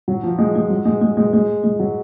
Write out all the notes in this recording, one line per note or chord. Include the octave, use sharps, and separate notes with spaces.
F#3
F3
G#3
G#3
F#3
G#3
G#3
G#3
G#3
G#3
F#3